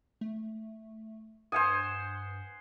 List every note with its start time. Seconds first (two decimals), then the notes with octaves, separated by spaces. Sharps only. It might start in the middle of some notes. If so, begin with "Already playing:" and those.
0.21 A3
1.52 G2 C5 F#5 G#5 D#6